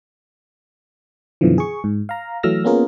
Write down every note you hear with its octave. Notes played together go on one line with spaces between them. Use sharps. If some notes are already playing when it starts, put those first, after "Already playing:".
F#2 B2 D3 E3 F3
G#4 C#6
G#2
F5 A#5
E3 F#3 A3 E6 F6 A#6
A#3 B3 C#4 F4 G#4 A#4